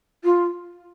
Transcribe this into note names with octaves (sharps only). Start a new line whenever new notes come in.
F4